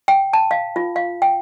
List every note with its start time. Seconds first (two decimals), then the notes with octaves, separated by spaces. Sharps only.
0.08 G5
0.33 A5
0.51 F5
0.76 F4
0.96 F5
1.22 G5